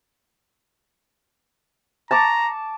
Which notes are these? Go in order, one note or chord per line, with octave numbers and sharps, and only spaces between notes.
A5 A#5 C#6 D6